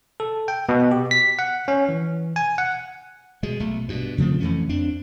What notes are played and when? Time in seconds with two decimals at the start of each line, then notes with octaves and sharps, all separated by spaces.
0.20 A4
0.48 G5
0.69 B2
0.91 G4
1.11 B6
1.39 F#5
1.68 C#4
1.89 E3
2.36 G#5
2.58 F#5
3.43 B2 G#3
3.60 B1 A3
3.88 G2 B2
4.18 C#3 F3 A3 C4
4.40 F2 E3 A3 C#4
4.69 F2 C4 D4